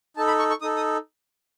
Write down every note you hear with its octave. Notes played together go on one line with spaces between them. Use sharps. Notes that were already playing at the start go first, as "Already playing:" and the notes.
D#4 A4 A5
B5
C#6
C#6
D#4 A4 D#6
D#6